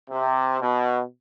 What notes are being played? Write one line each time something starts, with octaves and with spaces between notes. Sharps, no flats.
C3
B2